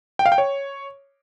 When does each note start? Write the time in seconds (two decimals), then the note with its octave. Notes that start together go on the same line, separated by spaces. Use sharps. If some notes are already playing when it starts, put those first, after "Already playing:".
0.19 G5
0.26 F5
0.32 G5
0.38 C#5